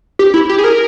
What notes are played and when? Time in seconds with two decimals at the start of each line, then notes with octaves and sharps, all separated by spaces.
0.19 G4
0.34 E4
0.49 G4
0.58 G#4
0.64 A#4